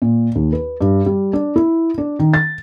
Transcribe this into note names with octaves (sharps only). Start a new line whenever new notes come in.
A#2
D#2
B4
G2
G3
D4
E4
D4
D#3
A6